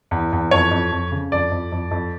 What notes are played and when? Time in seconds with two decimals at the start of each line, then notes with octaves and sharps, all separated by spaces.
0.11 E2
0.32 E2
0.51 F2 C#5
0.71 F2
0.92 F2
1.12 C#3
1.32 F2 D5
1.52 F2
1.72 F2
1.91 F2